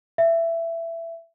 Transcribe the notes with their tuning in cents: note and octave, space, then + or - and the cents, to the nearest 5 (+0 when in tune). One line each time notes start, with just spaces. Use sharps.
E5 +15